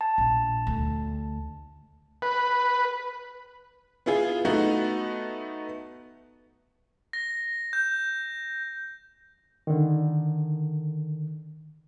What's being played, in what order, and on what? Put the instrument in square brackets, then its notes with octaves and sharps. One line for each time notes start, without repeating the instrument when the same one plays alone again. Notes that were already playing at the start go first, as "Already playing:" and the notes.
[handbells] A5
[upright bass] A#1
D2
[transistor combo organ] B4
[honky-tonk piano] B3 E4 F4 G#4
A3 B3 D#4 F#4
[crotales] A#6
G6
[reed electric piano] D3 D#3